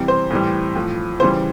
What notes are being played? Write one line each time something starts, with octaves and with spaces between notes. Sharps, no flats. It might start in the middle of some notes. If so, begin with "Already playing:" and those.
Already playing: C3 E3 G3
C5
A2 E3 G3
A2 F3
C#3 E3 G3 C5